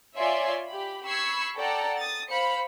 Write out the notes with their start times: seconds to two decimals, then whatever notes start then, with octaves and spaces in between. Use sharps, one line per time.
0.16 F4 C#5 D5 E5 G#5 C6
0.69 G4 B5
1.06 B5 C#6 E6 G#6 C7
1.57 A4 D5 F#5 G5 A#5
1.97 D#6 A6
2.30 C5 F5 B5 C#7